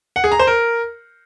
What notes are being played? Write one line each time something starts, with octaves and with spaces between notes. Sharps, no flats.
F#5
G#4
A#5
C5
A#4